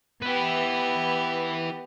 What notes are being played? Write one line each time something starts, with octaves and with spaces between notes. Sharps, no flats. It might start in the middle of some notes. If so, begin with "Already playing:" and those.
B3 E4 G4 B4